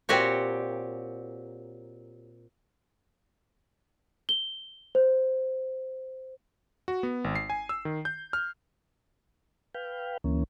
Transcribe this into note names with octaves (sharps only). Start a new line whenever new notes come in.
A#2 C4 F#4 G4 C#5
G7
C5
F#4
B3
G#1
C7
G#5
E6
D#3
G6
F6
B4 F5 G5
D2 E3 A#3 C#4